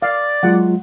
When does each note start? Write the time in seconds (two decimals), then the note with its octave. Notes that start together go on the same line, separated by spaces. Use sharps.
0.02 D5 F5
0.43 F#3 G#3 F4 F#5